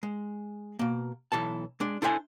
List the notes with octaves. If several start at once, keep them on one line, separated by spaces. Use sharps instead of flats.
G#3
B2 A#3
B1 E3 A4 A5
G#3 D4
D4 E4 A4 C5 F5 G#5